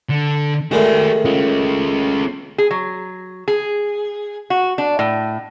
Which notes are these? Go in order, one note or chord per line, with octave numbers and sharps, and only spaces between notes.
D3
A2 D#3 G#3 F#4 D5
C#4 F4
G#4
F#3
G#4
F#4
D4
A2